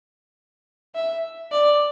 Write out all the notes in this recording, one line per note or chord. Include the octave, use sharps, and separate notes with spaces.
E5
D5